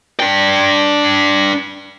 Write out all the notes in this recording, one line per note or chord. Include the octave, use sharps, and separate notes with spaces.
D4 G5